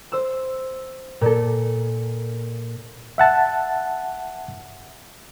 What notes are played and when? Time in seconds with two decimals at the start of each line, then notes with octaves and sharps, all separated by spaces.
0.12 C5 E6
1.21 A#2 A4
3.18 E5 F#5 A5